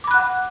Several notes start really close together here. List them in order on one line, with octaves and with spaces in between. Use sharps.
D6 B5 F#6 F#5